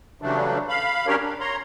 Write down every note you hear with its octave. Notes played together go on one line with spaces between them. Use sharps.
C#3 E3 F#3 G3 A3 D4
F5 B5
F#3 C#4 D4 G4 A#4 C#5
D4
C#5 A#5 C6